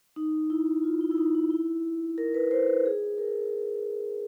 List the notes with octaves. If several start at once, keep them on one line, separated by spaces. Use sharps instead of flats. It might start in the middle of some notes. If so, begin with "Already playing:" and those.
D#4
E4
F4
E4
E4
D#4
D#4
E4
A#4
B4
C5
B4
G#4
A#4